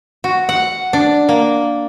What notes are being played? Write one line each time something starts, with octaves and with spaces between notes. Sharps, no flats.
F#4
F#5
D4
A#3